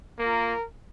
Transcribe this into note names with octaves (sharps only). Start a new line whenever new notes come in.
A#3 F4 A#4